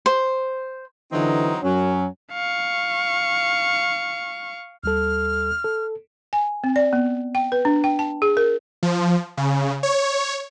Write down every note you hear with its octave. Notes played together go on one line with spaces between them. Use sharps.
C5
D3 E3 F#3 C4 D#4
F#2 F#3 C#4
F5 C#6
D#2 G3 A4 F6
A4
G#5
C4
D5
B3
G5
B4
D4
G5
A5
G#4
A#4
F3
C#3
C#5